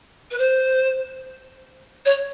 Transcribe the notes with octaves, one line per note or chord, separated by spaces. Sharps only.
B4
C5
C#5